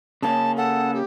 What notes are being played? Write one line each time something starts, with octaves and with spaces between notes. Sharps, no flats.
C#3 A#3 C#4 A5
A4 F#5
G4